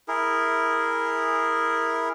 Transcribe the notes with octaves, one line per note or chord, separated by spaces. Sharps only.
E4 G#4 A#4